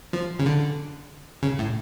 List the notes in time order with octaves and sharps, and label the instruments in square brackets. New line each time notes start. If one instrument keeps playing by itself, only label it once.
[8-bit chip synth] F3
C#3
D3
C#3
A2